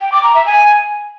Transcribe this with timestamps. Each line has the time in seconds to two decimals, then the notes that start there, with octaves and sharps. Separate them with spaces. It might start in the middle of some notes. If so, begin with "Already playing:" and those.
0.01 G5
0.12 D6
0.23 A#5
0.35 E5
0.46 G#5